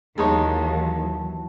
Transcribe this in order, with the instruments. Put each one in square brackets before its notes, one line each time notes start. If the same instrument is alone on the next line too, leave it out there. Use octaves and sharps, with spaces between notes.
[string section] D#2 [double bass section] E3 F#3 [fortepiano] G#3 D#4 C#5 [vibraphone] A5